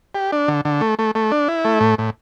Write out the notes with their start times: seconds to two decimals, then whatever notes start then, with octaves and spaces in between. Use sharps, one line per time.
0.15 G4
0.32 D4
0.48 D3
0.65 D3
0.81 A3
0.99 A3
1.15 A3
1.32 D4
1.48 E4
1.65 A3
1.81 A2
1.98 A2